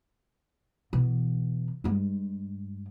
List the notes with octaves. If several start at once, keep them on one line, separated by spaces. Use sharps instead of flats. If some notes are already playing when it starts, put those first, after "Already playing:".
B2 E3
G2 G#3